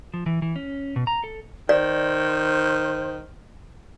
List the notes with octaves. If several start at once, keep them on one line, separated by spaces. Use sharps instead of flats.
F3
E3
E3
C#4
B2
A#5
A4
D#3 C5 D5